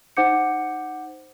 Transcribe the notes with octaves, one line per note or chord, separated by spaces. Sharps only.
D#4 C5 F#5 D6 G6 C#7